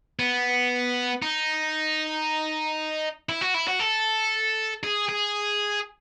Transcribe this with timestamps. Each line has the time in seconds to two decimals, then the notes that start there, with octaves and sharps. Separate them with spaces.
0.19 B3
1.22 D#4
3.29 E4
3.41 F#4
3.54 E4
3.68 F#4
3.80 A4
4.83 G#4
5.09 G#4